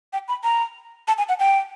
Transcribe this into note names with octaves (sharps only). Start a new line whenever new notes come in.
G5
B5
A#5
A5
G#5
F#5
G5